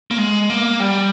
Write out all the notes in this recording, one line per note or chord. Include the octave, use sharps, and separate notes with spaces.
A#3
G#3
A#3
G3